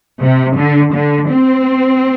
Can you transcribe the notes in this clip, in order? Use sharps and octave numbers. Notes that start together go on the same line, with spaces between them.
C3
D3
D3
C4